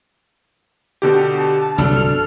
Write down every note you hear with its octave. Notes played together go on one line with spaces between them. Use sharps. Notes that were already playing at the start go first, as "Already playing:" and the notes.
B2 D3 G4
A5
G1 C2 F#3 D4 A4 F6